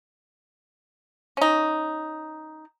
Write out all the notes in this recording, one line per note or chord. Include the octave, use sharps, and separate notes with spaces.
C#4 D#4